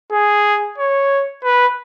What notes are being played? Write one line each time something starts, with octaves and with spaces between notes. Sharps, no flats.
G#4
C#5
B4